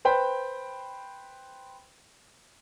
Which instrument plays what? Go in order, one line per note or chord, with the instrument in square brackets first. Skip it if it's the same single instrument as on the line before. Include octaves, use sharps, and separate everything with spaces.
[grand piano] B4 C5 G5 B5